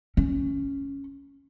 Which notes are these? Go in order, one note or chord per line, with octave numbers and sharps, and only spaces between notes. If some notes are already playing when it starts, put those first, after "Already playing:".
C#4